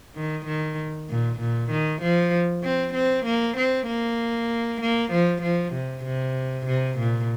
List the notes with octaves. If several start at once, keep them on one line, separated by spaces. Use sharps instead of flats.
D#3
D#3
A#2
A#2
D#3
F3
C4
C4
A#3
C4
A#3
A#3
F3
F3
C3
C3
C3
A#2